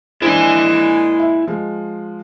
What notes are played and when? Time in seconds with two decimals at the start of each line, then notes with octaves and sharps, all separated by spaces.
0.22 A#2 G#3 D4 E4 C5 G#5
1.19 E5
1.47 F3 G#3